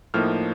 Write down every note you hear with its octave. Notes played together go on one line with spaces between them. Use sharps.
A2 F3 A#3 D#4 F6